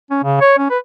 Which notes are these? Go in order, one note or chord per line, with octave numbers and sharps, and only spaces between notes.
C#4
C#3
C#5
C#4
B4